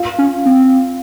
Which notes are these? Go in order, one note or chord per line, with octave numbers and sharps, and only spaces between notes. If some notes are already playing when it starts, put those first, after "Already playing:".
Already playing: F4
C#4
C4